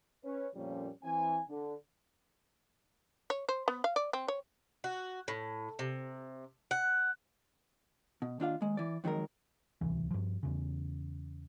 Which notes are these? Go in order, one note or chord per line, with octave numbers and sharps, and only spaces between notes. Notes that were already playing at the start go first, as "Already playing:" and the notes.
C#4 B4 C#5
F2 A#2 F3 G3 A#3 C#4
E3 C4 G#5
D3
C#5
C5
B3
F5
D5
C4
C#5
F#4
A2
C3
F#5
B2
D#2 D4 F4 F5
D#2 G#3
E3 D5
F2 D#3 F#3 G#3 A#4
D1 C2 E3
G2 F3
E2 C#3